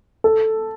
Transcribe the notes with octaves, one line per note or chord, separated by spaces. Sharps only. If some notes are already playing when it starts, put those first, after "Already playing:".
A4